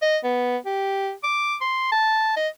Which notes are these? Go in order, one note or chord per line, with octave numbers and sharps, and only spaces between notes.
D#5
B3
G4
D6
C6
A5
D#5